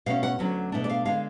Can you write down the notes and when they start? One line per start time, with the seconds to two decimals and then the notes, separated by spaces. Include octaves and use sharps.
0.06 B2 A3 C#4 F5
0.23 F#5
0.39 D2 D3 F#3 C#4
0.72 B2 A3 D4
0.84 D5
0.90 F5
1.05 D3 G#3 F5